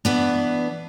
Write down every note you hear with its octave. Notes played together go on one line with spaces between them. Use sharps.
E3 B3 D4